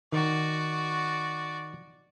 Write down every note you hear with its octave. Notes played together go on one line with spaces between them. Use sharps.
D#3 F#4 D5